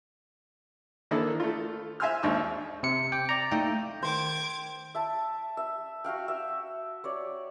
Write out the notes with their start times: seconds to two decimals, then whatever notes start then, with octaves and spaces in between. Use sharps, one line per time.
1.11 D#3 A#3 D4 E4 A4
1.40 A3 F4
2.00 E5 F5 G#5 C6 E6 F6
2.23 G#1 D#2 D4 D#4 C#6 E6
2.83 C3 C#7
3.12 G5 D6
3.29 D5 A#5
3.51 A3 A#3 D#4 G5
4.03 D#3 C5 D6 G#6
4.95 E5 A5
5.57 E5
6.04 F#4 E5 F5 G5
6.28 E5
7.04 C#5 D5